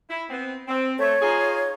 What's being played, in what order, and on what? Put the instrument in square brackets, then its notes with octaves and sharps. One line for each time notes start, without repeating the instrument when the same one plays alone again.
[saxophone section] E4
B3 C4
C4
[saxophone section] A3 [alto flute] C#5
[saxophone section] D#4 F4 G#4